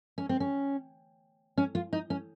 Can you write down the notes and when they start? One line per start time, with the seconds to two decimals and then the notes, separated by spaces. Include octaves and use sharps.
0.18 C#4
0.29 C4
0.40 C#4
1.57 C#4
1.75 F4
1.93 D#4
2.10 C#4